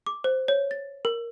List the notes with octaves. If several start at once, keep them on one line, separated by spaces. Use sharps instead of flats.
D6
C5
C#5
A6
A#4